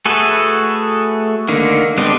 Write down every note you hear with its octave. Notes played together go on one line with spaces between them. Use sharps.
A3 F#4 G#4 A4 B4
D3 D#3 A#3
G3 G#3 B3 C4 D4